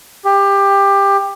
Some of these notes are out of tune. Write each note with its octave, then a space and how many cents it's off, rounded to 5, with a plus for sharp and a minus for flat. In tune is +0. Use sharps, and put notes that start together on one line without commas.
G4 +20